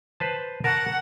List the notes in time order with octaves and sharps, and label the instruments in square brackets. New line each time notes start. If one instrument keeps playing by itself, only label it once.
[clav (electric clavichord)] B4 C5 A5
[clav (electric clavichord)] A#4 A5 [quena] F#5